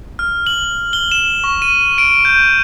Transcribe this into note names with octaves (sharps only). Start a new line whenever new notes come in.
F6
F#7
G7
E7
C#6
D#7
D7
G6